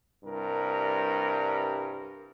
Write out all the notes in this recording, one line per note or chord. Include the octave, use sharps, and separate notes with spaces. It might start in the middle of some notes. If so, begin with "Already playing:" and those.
C2 G2 A#4